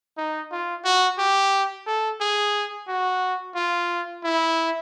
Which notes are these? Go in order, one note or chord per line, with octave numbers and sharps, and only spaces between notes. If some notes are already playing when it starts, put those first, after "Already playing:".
D#4
F4
F#4
G4
A4
G#4
F#4
F4
E4